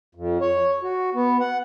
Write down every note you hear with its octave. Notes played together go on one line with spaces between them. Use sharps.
F2
C#5
F#4
B3
F#5